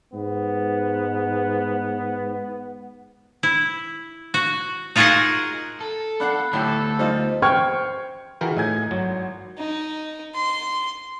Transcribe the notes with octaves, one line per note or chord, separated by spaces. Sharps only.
G#2 B3
E4
F#4
D#4 F4 F#4 G#4 A#4 F#5
A4
D4 F#5 B5 F#6 C7
D2 A2 G4 A4
G3 D#4 F4 C5 D#5
C5 G5 C#6 F6 G#6
E3 F4 F#4 G#4 A#4 G5
A2 D#4 G#5 G#6
G#1 F#3
D#4
C6